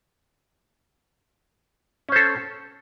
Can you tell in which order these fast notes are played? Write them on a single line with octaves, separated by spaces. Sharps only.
C#4 C5 A4